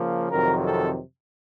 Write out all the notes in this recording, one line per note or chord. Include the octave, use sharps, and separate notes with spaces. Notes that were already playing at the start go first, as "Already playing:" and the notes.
Already playing: C#3 F3 A#3
F2 C3 D#3 F#3 A#4
A4